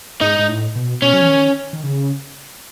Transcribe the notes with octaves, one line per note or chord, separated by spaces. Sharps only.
G#2 D#4
G#2
A2
B2
B2 C#4
F#3
E3
D#3
D#3
C#3